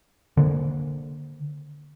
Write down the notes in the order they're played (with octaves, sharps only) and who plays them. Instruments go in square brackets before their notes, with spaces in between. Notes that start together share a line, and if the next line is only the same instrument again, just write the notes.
[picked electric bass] D3 A#3